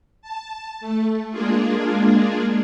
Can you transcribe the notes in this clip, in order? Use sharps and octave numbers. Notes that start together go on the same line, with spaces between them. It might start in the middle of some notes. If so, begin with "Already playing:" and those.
A5
A3
G#3 A#3 D4 F4 G#4